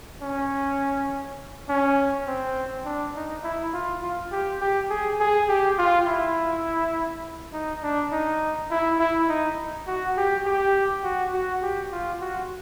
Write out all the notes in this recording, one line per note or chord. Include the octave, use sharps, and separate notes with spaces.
C#4
C#4
C4
D4
D#4
E4
F4
F4
G4
G4
G#4
G#4
G4
F4
E4
D#4
D4
D#4
E4
E4
D#4
F#4
G4
G4
F#4
F#4
G4
F4
F#4